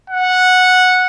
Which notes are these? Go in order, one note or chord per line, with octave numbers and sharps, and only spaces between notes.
F#5